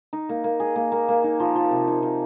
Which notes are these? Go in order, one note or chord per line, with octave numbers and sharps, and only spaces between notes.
D#4
A#3
A#3
G#4
A#3
A#3
A#3
D#4
F3
F3
C3
D#4
F3